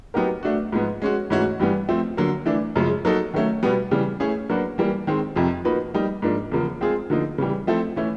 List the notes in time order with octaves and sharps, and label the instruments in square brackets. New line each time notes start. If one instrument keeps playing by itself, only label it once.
[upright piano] F#3 B3 D#4 G4 A#4
A3 D4 F#4
G#2 F3 G#3 B3
G#3 C#4 F#4
G#2 E3 A3 C#4 F#4
G2 E3 G3 B3
F3 A3 C4
D3 F#3 A#3
E3 A3 D4
F#2 C#3 F3 G#3
F#3 A#3 D#4 F#4 A4
D#3 F#3 A3 C#4
B2 G3 B3
C#3 E3 G3
A3 C#4 E4 G#4
F#3 A#3 D4 F#4 B4
E3 G3 A#3
D#3 G#3 C4
F2 C3 F3
F3 A#3 D#4 F#4 B4
G3 A#3 D#4
G#2 F3 A#3 D4
E2 C#3 F3 A#3
G#3 C4 F4 G#4
D3 F3 A#3 D#4
C#3 E3 G3
F3 A3 C4 E4 A4
E3 A3 C#4 E4